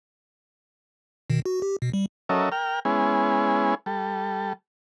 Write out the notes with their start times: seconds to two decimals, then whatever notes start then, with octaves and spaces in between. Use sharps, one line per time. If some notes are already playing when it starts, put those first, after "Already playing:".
1.30 B2 D#3
1.46 F#4
1.62 G4
1.82 B2
1.93 G3
2.29 F#3 C#4 A4 A#4 D#5 E5
2.52 A#4 G5 F6
2.85 G#3 B3 C#4 E4 G#4
3.86 G3 A4